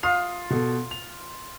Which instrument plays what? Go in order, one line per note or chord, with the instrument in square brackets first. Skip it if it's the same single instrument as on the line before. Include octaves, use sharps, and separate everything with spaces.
[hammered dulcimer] F4 [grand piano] D#6 C7 F7
[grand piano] B2 A4
F7